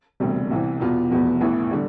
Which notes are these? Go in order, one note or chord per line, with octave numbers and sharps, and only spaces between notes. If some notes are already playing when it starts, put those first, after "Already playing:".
E1 D2 C3 G3
C2 C3 E3
E2 B2 B3 F4
F1 E2 B2 B3
A1 A2 E3 B3
D3 G3